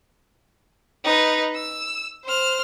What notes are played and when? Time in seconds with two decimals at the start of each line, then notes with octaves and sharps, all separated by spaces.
1.05 D#4 B4
1.55 E6
2.25 C5 F6